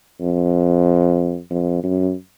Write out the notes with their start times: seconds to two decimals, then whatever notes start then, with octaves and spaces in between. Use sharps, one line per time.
0.21 F2
1.50 F2
1.83 F#2